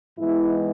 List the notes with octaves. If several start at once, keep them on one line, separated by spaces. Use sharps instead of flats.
G#2 E3 G#3 B3 E4